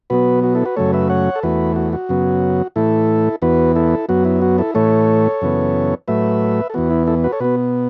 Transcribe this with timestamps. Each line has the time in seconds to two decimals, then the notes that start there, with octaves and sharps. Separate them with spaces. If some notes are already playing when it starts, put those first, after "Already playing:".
0.10 B2 F#3 B3 F#4 B4
0.44 F#4
0.55 E4 A4
0.65 F#4 B4
0.76 F#2 C#3 F#3 A3 A4 C#5
0.93 B4 E5
1.09 C#5 F#5
1.36 A4
1.43 E2 E3 A3 F#4 B4
1.76 F#4
1.93 F#4
2.09 F#2 C#3 F#3 B3
2.76 A2 E3 A3 E4 A4
3.42 E2 E3 B3 F#4 B4
3.76 E4 A4
4.09 F#2 F#3 B3 F#4
4.25 E4
4.42 F#4
4.58 E4 A4
4.75 A2 E3 A3 A4 C#5
5.41 F#2 C#3 E3 B3
6.08 A2 F#3 A3 B4 E5
6.70 A4
6.74 E2 E3 B3 F#4
6.91 E4
7.07 E4 A4
7.24 F#4 B4
7.32 A4 C#5
7.40 B2 B3 F#4 B4